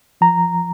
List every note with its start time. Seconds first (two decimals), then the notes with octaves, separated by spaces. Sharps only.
0.21 F3 A#5